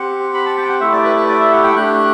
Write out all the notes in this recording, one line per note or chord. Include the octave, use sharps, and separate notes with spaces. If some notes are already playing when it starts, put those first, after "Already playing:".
Already playing: C4 G4 F#5
B5
A5
G5
F#5
A3 E4 G4 E5
D5
B4
B4
D5
E5
F#5
G5
A3 D4 G4 F#6